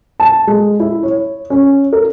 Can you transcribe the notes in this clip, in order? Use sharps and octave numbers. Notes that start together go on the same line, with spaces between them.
A5
G#3
E4
C#5
C#4
A#4